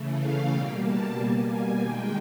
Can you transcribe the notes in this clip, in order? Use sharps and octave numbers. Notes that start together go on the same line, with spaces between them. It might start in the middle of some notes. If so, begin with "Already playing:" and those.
Already playing: C#3 E3 A3
F5
B2 G3 A#3 G5
A5
B2 G3 A#3 G#5
G#5
D#3 G#3 G5